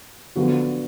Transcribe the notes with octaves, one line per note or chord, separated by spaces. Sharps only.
D3 F3 B3 F#4